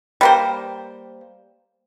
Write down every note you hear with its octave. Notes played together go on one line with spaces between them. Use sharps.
G3 A#3 C5